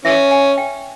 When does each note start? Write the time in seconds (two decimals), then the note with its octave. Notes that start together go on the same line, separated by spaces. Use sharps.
0.05 E3 C#4 E5
0.31 G#5
0.58 G5